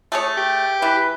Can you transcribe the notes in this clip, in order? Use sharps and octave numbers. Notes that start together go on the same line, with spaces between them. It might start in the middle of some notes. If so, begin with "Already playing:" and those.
A3 G#4 C#5
G4
E3 B4